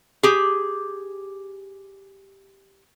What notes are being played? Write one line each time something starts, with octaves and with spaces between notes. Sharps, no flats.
G4 G#4